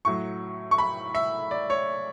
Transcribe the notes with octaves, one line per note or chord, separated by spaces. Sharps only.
A2 F#3 C#6
C#6
B5
E5
D5
C#5